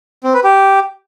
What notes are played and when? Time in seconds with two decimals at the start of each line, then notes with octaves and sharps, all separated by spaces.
0.24 C4
0.34 B4
0.44 G4